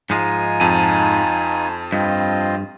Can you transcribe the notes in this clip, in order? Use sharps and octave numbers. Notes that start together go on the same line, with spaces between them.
G#2 F3 G#3 D#4 F4 G#5
F2 A5 D#7
G2 C4 F4 D#5